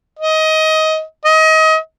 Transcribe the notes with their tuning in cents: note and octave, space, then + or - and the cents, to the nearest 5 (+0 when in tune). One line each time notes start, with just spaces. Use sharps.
D#5 +20
D#5 +30